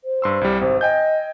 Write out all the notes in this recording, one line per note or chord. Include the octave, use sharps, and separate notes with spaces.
C5
G2 C6 E6
C2 G3
G#1 C3 C5
D#5 G5 G#5 G6